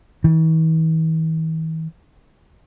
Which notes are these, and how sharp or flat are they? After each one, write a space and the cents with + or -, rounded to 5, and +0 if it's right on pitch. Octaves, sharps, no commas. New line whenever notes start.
E3 -45